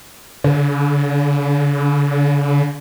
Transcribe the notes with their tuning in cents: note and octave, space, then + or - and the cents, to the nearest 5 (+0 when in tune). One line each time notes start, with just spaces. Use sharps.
D3 -45